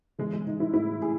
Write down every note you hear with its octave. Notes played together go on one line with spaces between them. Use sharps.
E3 G#3
G#3
E3 D#4
E4
A2 E4
A2 G#4